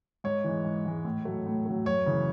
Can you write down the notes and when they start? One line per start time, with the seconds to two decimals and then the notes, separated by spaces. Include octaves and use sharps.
0.24 G#2 C#5
0.44 E3 G#3
0.65 G#2
0.85 E3 G#3
1.05 A2
1.25 F#3 A3
1.46 A2
1.66 F#3 A3
1.86 F#2 C#5
2.06 C#3 E3